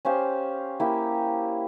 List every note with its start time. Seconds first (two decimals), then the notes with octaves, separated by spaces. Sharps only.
0.05 C#4 G4 C5 F5
0.80 A#3 E4 G4